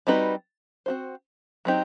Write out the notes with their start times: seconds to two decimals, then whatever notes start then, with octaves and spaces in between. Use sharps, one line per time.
0.07 G3 C4 D#4 F#4 B4
0.86 C4 F#4 C5
1.65 F#3 C4 D#4 G4